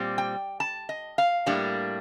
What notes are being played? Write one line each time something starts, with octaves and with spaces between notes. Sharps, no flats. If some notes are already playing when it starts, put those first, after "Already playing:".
Already playing: A#2 G3 C4
G5
A5
D#5
F5
A2 G3 A#3 D4